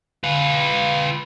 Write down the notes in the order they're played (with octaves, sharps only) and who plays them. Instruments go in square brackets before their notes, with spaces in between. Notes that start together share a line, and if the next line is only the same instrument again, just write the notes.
[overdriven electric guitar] F4 B4